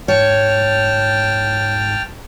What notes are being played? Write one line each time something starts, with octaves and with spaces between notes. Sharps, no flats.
G#2 C#5 G5 A5 F6